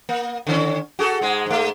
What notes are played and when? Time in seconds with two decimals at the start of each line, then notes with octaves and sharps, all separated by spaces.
0.09 A#3
0.47 D3 D#3 C#4
0.99 F#4 G#4 A4
1.21 G#2 G#3 G#4
1.46 G#2 A3